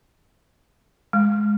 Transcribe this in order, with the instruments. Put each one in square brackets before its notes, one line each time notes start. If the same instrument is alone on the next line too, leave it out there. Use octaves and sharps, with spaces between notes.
[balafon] G#3